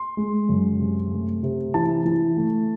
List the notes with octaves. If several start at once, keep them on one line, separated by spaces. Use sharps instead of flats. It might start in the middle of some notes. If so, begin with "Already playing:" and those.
Already playing: C6
G#3
F#2
C3
A3
C3
E3 A5
E3
A3